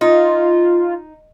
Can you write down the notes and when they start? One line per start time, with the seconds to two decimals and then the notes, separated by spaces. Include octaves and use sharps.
0.01 D#4 F4